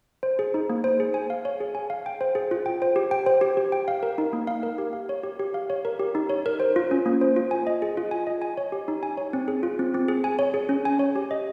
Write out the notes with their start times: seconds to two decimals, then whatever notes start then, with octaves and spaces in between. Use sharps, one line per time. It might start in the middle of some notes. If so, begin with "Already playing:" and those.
0.23 C5
0.39 G#4
0.54 D#4
0.70 A#3
0.84 C5
1.00 G#4
1.14 G#5
1.30 F5
1.45 C#5
1.60 G#4
1.75 G#5
1.90 F5
2.06 G5
2.21 C5
2.35 G#4
2.51 F4
2.66 G5
2.82 C5
2.96 G4
3.11 G5
3.26 C5
3.41 G4
3.57 G4
3.72 G5
3.88 F5
4.03 A#4
4.18 D#4
4.33 A#3
4.47 F5
4.63 A#4
4.78 G4
4.93 F5
5.09 C#5
5.23 G4
5.40 G4
5.54 F5
5.70 C#5
5.85 A#4
5.99 G4
6.15 D#4
6.29 C#5
6.46 A#4
6.60 C5
6.76 F4
6.91 C#4
7.06 A#3
7.21 C5
7.36 F4
7.51 G#5
7.67 D#5
7.82 G#4
7.97 F4
8.11 G#5
8.27 D#5
8.42 G#5
8.57 C#5
8.72 G4
8.88 D#4
9.03 G#5
9.17 C#5
9.33 C4
9.48 G#4
9.63 F4
9.79 C4
9.94 C4
10.08 G#4
10.24 G#5
10.39 C#5
10.54 G#4
10.69 C#4
10.85 G#5
10.99 C#5
11.16 G4
11.31 D#5